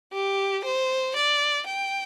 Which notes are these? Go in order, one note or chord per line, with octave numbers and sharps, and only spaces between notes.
G4
C5
D5
G5